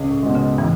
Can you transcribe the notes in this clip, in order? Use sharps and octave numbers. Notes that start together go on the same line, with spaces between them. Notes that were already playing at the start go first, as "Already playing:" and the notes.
Already playing: C#2
A2
B2 G#3
C#3
A2 E3